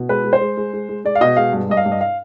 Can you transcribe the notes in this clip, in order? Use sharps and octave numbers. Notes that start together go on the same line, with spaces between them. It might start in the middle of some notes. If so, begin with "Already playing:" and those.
Already playing: B2
G#3 B4
G#3
C5
G#3
G#3
G#3
G#3
G#3 D5
F5
B2 D#5
G#3 F5
G2
G2 D#5
F5
G2
D#5
F5